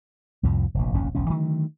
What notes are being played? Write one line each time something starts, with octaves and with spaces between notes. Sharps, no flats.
C2 F2 A2 F3
F1 A#1
F1 A#1 D#2 C#4
E1 B1 C#4
D3 D#3 F#3 A3